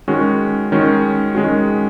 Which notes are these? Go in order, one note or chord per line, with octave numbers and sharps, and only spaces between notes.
D#3 G#3 C#4 F#4
D#3 G#3 C#4 F#4
D#3 G#3 C#4 F#4